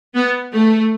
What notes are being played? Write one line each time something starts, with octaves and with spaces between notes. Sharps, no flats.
B3
A3